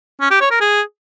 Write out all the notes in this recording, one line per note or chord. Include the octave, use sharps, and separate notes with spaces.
C#4
G4
C#5
A#4
G#4